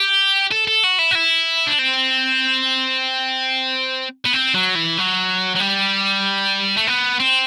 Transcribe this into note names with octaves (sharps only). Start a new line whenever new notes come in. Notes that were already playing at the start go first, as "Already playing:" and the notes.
Already playing: G4
A4
A4
F#4
E4
F#4
E4
D4
C4
B3
C4
F#3
E3
F#3
F#3
G3
A3
B3
C4